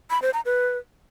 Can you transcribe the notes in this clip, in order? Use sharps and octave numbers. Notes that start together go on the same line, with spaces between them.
B5
C5
A#5
B4